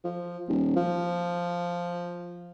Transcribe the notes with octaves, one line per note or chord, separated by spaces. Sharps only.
F3
D#1
F3